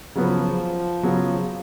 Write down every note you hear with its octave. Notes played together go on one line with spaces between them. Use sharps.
C#3 F3 F#3 B3
C#3 F#3 B3